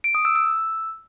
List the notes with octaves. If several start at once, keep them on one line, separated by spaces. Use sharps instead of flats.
D7
D#6
E6
E6